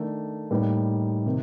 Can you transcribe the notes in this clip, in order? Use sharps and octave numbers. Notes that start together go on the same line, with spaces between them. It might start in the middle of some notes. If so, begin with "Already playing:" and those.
Already playing: D#3 A3 D4
A2 G3 A#3 D#4
C3 D#3